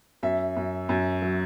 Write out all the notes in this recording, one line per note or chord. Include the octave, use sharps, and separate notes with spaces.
F#2 E5
F#2
F#2
F#3